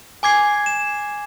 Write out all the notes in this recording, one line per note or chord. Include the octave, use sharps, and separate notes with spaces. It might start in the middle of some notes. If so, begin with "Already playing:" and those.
G#5 D6 G#6 C7
E7